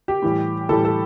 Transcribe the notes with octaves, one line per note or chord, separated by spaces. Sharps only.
G4
A2 E3 G3
A2 E3 G3 A4
A4